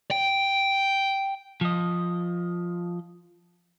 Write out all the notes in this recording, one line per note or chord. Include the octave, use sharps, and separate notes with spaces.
G5
F3 D#5